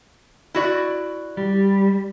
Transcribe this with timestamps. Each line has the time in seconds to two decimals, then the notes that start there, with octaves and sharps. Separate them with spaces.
0.54 E4 F#4 D5
1.37 G3 G4